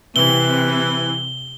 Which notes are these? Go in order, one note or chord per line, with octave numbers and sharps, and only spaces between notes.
C3 E3 G7